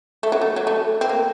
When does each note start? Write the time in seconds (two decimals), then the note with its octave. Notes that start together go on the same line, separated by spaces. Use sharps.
0.23 A3
0.32 F#3
0.42 A3
0.56 F#3
0.67 A3
1.01 C4
1.09 A#3